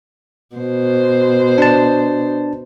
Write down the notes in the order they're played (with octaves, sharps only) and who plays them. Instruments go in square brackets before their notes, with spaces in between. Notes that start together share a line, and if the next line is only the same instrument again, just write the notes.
[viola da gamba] B2 C5
[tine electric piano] D4 A5